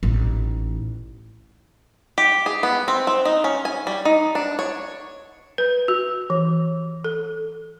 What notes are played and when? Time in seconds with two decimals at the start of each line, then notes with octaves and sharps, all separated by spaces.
0.03 A1 D#4
2.18 G4
2.46 G#4
2.63 B3
2.88 C4
3.07 C4
3.25 D#4
3.44 C#4
3.65 G#5
3.87 G3
4.05 D#4
4.35 D4
4.59 C#5
5.58 B4
5.88 F#4
6.30 E3
7.04 A4